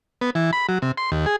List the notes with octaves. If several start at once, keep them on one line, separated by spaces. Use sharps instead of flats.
B3
E3
B5
F#3
C3
C6
D#2
G#4